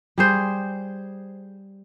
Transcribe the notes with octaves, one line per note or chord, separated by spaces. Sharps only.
G3 G#4 C5